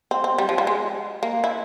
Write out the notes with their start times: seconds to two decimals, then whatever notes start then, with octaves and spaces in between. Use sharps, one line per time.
0.11 C4
0.24 C4
0.38 G3
0.49 F3
0.58 G3
0.67 G#3
1.23 A#3
1.44 E4